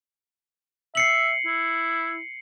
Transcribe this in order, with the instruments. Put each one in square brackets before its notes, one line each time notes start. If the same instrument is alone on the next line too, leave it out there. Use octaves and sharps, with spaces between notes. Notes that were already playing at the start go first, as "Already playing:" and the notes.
[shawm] E5 [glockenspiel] C7 C#7 F#7
[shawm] E4